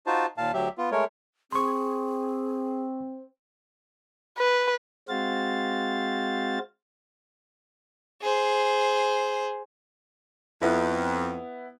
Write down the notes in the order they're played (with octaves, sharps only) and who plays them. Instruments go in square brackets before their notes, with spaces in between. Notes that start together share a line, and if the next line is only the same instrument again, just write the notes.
[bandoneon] D#4 F4 F#4 C5 A5
D#2 A#2 F5 A5
D2 F#3 G4 E5
B3 F4
G#3 A3 A#4 C#5
[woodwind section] C4 [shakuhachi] G#4 [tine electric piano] C6 C#6
[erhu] B4
[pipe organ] G#3 C4 F#4 C5 F5 A6
[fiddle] G#4 C5
[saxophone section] F2 [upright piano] B3 E4